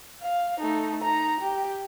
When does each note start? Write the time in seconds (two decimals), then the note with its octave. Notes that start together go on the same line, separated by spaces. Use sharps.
0.22 F5
0.60 A3 D#4
1.04 D#4 A#5
1.41 G4